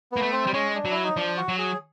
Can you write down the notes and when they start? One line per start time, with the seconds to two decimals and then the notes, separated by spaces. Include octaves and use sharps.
0.12 A#3 B3
0.22 A3
0.32 C4
0.47 G3
0.53 G#3 C#4
0.75 D4
0.85 F#3
0.91 E4
1.04 D#4
1.16 F3 D4
1.37 F#4
1.48 F#3
1.58 G#4